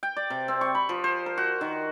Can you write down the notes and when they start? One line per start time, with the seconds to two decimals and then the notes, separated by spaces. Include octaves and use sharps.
0.03 G5
0.16 D5
0.30 C3
0.48 C4
0.61 C#6
0.75 B5
0.89 F3
1.04 C5
1.26 A#4
1.37 F#4
1.61 D#3